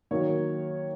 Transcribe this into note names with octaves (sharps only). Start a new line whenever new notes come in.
D#3 F#3 A#3 C#5